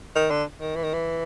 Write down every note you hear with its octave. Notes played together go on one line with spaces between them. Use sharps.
D#3
D3
D#3
E3
D#3
E3